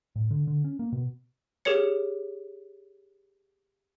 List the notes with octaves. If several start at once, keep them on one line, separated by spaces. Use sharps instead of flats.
A2
D3
D3
C#4
A#3
B2
G4 G#4 A#4 C#5 C#7